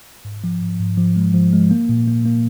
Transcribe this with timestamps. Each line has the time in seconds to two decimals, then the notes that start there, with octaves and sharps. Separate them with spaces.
0.25 G#2
0.44 F3
0.62 G#2
0.80 G#2
0.98 F3
1.16 G#3
1.34 F3
1.53 G#3
1.71 A#3
1.89 A#2
2.07 A#3
2.25 A#3